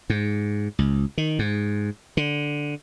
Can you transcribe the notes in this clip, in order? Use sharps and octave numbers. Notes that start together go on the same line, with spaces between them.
G#2
C#2
D#3
G#2
D3